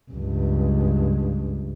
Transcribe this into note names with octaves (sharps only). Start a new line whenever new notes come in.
C#2 G2